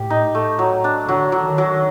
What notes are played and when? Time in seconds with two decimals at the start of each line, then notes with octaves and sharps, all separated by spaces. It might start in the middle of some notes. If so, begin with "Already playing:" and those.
Already playing: A2 G4
0.10 D#4
0.35 A3
0.59 F#3
0.84 D4
1.08 D3 F#3
1.32 F#3
1.45 D#3
1.58 F#3